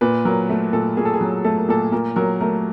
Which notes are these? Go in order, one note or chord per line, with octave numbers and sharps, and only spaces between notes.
A#2 B4
F#3 A#4
A3
A#2 A4
A#2 G#4
A4
G#4
F#3
A3 A4
A#4
A#2 A4
A#2 A#4
F#3 A#4
A3 A#4